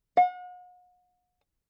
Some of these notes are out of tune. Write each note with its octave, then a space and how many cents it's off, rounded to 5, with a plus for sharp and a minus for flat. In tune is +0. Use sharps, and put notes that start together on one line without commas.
F#5 -40